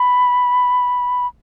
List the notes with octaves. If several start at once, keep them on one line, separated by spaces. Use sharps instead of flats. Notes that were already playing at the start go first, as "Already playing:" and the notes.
Already playing: B5